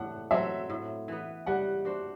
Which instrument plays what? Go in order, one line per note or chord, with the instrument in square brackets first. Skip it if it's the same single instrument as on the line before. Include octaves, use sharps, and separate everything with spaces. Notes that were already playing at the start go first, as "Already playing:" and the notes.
Already playing: [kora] A2 A3 D4 [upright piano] F#5 A5
[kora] F#3 C4 [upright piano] E5
[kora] A2
E3 B3
[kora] G3 [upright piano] F#5
[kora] D4 F#4 C5